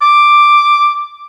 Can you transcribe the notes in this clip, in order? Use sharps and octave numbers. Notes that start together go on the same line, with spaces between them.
D6